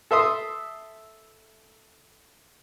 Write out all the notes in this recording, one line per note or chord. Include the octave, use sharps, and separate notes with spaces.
A4 E5 C6 D#6